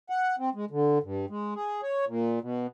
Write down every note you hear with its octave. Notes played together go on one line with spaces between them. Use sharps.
F#5
C4
G#3
D3
G2
G#3
G#4
C#5
A#2
B2